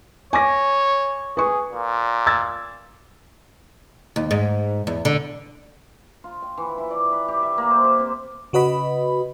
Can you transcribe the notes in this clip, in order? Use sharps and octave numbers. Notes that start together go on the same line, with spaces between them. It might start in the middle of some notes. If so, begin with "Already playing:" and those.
C#5 G#5 D6 A#6
G#4 B4 C#6
A#2
E6 G#6 A6
D#2
G#2
E2
D3
F4
G5
E3
E4
D5
B4
G4
E5
A#3
C5
G4
C4
C#3 F#4 B4 D#5 B5